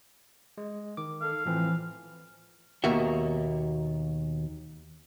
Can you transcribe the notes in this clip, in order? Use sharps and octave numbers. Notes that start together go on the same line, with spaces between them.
G#3
D#3 D6
A4 F5
A2 E3 F3 C4
D#2 B2 A#3 F#4 E5